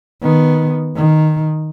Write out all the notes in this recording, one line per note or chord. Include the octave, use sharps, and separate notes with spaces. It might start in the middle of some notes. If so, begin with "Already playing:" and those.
D#3 B3
D#3